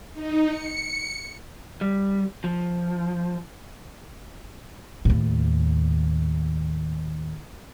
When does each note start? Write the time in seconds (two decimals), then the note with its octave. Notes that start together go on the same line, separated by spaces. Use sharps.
0.13 D#4
0.48 C#7
1.81 G3
2.44 F3
5.05 D#2 A2